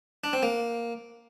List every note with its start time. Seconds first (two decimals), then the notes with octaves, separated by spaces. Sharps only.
0.24 D4
0.33 C4
0.43 A#3